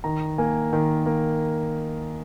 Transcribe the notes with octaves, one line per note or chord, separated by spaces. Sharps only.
D#3 A#5
A#3 G#5
D#3
A#3